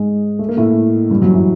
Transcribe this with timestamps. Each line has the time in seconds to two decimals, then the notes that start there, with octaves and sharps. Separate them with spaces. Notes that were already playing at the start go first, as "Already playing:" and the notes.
Already playing: G#2 G#3
0.39 A3
0.49 A#3
0.57 A2 A3
1.10 G2 G3
1.22 F#2 F#3
1.34 E3